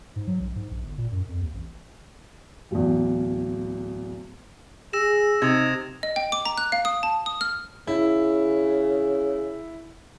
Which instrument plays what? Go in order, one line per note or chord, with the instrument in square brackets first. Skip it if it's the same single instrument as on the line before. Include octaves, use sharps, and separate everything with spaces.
[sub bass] G#2
F#3
A#1
G#2
A#1
G1
A#2
F#2
F2
D#2
A1
[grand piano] D1 E2
[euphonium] G#4 [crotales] E6 A#6 E7
[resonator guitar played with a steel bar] C3 [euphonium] D#4 [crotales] D#6 G#6
[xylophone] D#5
G5
D6
A#5
F#6
F5
D#6
A5
D#6
F6
[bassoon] C#3 [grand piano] E4